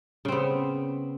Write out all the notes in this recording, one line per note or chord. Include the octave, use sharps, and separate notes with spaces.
C#3 B3 C4